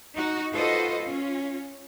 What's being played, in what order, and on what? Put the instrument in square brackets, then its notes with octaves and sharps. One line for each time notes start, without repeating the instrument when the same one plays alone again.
[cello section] D#4 F#4
F4 F#4 A4 B4 C5 D#5
C#4 F4